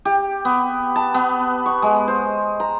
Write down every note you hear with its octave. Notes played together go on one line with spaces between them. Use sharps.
G4
B3
A5
B3
C#6
G#3
C5
A#5